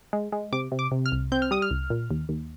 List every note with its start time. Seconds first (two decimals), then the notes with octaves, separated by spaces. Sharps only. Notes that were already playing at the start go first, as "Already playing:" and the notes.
0.13 G#3
0.32 G#3
0.53 C3 D6
0.72 C3
0.79 D6
0.91 C3
1.06 F6
1.12 C2
1.32 C4 G6
1.42 F6
1.51 G3 D#6
1.62 F6
1.71 C2
1.90 A#2
2.11 D#2
2.29 D#2